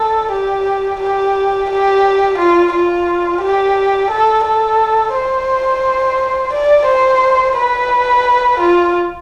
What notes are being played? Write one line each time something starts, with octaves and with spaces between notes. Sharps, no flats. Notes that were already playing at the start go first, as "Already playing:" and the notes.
Already playing: A4
G4
G4
G4
F4
F4
G4
A4
A4
C5
D5
C5
B4
F4